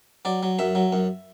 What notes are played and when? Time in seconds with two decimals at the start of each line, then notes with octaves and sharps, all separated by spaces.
0.25 F#3 D5
0.43 F#3
0.59 F#2 E5
0.75 F#3
0.93 F#2